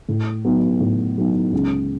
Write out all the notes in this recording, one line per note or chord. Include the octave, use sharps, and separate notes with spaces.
A2
F#3 B3 D#4
A2
F#3 B3 D#4
C#2